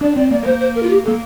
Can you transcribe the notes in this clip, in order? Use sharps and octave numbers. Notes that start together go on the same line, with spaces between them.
D4 D5
C4 D5
A#3 D5
A#3 C5
C5
A#4
F4
G4
A4
A#3